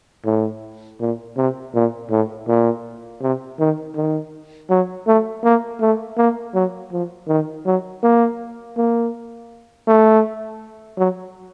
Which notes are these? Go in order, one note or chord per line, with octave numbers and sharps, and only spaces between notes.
A2
A#2
C3
A#2
A2
A#2
C3
D#3
D#3
F#3
A3
A#3
A3
A#3
F#3
F3
D#3
F#3
A#3
A#3
A3
F#3